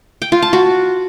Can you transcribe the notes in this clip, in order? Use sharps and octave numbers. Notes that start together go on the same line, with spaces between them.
G5
F4
A5
F#4